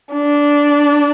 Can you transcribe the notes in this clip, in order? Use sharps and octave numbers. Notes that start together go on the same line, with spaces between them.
D4